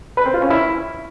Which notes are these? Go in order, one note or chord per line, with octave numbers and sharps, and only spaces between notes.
B4
C4
F4
C#4
E4